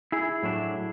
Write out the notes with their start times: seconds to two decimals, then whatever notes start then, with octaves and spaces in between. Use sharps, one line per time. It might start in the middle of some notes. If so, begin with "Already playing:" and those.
0.12 E4 G#4
0.43 A2 F#3 A3 D4